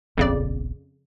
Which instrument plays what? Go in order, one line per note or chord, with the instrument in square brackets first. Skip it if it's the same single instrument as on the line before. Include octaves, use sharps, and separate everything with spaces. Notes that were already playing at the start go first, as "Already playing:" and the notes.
[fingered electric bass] D#1 A#1 B3 [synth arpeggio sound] F2 C#3 D5